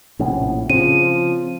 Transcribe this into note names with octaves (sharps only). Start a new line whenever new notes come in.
A#1 A2 C3 B3 C#4
C#3 F3 C4 D#7